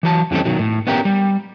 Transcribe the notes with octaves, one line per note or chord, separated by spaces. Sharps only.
E3 F#3 A5
F2 E3 G3 C4 C#4 A4
B2 D#3 F#3
A2
B3 C#4 G4 A#4
G3